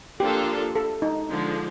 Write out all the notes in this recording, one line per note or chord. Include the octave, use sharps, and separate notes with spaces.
F3 A#3 D4 F4 G4 A4
A4
D#4
D3 F3 G#3